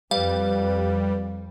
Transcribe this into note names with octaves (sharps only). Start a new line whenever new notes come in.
F2 G3 B4 F5